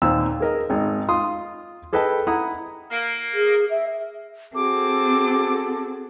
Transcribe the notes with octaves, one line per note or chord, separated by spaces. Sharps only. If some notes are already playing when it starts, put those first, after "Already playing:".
D#2 A#2 C4 E6
G#4 A#4 D#5
G#1 G#3 D#4
F4 C6 D#6
G#4 A4 B4 D#5 G5 A5
E4 F#5 A#5 D#6
A#3
G#4
E5
C4 F#4 G#4 A4 D6